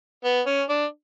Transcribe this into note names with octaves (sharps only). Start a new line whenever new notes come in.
B3
C#4
D4